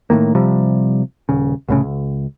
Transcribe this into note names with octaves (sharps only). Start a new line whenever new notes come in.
A2 C3 D#3 A#3
C3 F3 G3
D#1 C#3
C2 A2 C#3
C#2